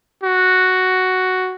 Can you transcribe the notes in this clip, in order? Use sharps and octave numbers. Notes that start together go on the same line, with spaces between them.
F#4